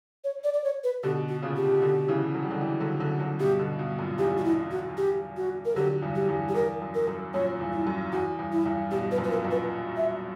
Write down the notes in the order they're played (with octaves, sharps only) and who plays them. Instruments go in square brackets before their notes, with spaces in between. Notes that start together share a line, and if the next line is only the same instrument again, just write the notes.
[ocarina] C#5
D5
D5
C#5
B4
[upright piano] B2 D3 [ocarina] G4
[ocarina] F#4
[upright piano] A#2 C#3
[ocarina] G4
[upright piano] B2 D3
C#3 E3
F#3
G3
D3 F#3
E3 G3
D3 F#3
D3 F#3
D3 F#3
[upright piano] G2 B2 [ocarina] G4
[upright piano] B2 D3
G2 B2
F#2 A#2
[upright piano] E2 G2 [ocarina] G4
[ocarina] F#4
E4
F#4
G4
F#4
A#4
[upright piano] D3 F#3 [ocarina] G4
[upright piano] E2 G2
[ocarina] G4
[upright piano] E2 G2
[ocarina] G4
[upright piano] E2 [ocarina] A#4
[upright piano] F#2
[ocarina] A#4
[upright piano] F#2
[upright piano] F#2 A#2 [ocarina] C#5
[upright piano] E2 G2
[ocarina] E4
[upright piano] F#2
[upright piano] E2 [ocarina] F#4
[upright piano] E2 G2
[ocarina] E4
[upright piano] E2 G2
[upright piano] G2 B2 [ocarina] G4
[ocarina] B4
[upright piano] F#2 A#2
[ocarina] B4
A#4
[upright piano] F#2 A#2
[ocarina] B4
E5